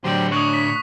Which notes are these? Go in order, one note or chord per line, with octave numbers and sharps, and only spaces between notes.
A2 D3 F#3 G4 C5 D5 C6
D4 C#5 D5 C#6 D#6 F#6
B6